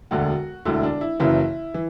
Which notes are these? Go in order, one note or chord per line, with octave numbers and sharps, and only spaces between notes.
E1 D2 D3 F#4
E1 D2 D3 E4
D4
E4
F#1 F#2 C#3 E3 E4
E3